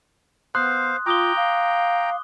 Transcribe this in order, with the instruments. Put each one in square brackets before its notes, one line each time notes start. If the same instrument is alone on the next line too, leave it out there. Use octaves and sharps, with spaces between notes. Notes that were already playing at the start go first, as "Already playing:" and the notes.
[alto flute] B3 [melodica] C5 F5 [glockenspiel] C6 D#6 F#6
[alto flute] F4 [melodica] G5 A#5 [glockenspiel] D6 D#6 G7
[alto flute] F5